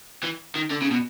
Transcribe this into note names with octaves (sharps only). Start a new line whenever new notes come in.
E3
D#3
D3
C#3
B2